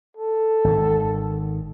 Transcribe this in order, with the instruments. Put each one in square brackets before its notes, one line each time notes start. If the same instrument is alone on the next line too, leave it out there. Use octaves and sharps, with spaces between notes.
[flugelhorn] A4
[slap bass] G#1 D#3